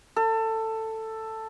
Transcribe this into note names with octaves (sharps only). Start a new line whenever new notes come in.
A4